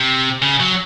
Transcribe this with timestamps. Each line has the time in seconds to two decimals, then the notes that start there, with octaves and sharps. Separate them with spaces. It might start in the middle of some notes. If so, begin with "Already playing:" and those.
Already playing: C3
0.42 C#3
0.60 F#3